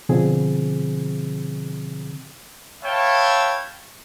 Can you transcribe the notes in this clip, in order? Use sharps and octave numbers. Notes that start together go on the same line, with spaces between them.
B2 D3 F3 C4 G#4
B4 C#5 E5 F5 G5 A5